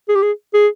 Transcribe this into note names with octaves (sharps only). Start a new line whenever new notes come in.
G#4
G4
G#4
G#4